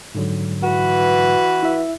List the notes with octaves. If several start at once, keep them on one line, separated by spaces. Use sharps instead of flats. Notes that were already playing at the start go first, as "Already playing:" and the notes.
G#2 D3 F#3
E3 F#4 B4
E4 E5